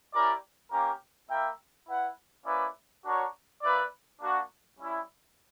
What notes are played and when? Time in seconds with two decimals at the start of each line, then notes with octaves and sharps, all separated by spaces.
0.12 C#4 E4 G4 A#4 D5
0.70 A#3 C#4 G4 A#4
1.29 A#3 E4 A#4 E5 G5
1.87 E4 B4 F#5
2.45 A#3 C#4 E4 B4 D5
3.04 D4 F#4 A#4 C#5
3.62 A#3 E4 B4 D5
4.20 A#3 D4 F#4
4.78 G3 C#4 E4